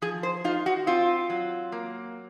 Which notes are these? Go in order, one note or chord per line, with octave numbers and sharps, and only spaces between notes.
F3 G#4
C5
D#4 F4
F#4
C4 F4
F#3
A#3